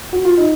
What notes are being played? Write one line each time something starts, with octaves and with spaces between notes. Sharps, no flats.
F#4
F4
D#4